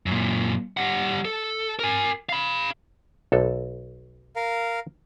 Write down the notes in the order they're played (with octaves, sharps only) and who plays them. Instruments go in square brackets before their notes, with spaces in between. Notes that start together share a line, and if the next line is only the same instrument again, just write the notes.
[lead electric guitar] F#2 A#2
G3 F#5
A4
A#4 G#5
F5 B5
[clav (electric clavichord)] B1 A4
[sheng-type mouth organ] A#4 F5